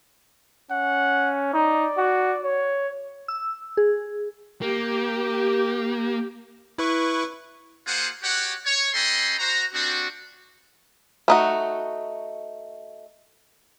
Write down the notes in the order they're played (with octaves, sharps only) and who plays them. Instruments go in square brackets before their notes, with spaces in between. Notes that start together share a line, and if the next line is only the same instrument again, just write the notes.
[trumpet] C#4 [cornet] F#5
[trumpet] D#4 [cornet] D5
[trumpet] F#4
C#5
[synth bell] E6
G#4
[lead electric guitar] A#3 [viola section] G4
[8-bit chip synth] E4 B4 C#6
[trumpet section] A#3 F4 G#4 C5 F#5
F#4 G4 C#5 F#5
C#5
C#4 A4 D#5 G5 B5 C6
F#4 C5 A#5
G3 C4 D4 F#4
[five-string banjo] A3 D#4 F#4